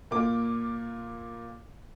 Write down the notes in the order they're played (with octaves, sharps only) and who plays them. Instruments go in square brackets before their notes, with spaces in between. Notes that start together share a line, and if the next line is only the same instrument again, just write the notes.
[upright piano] A#2 A#3 F4 D6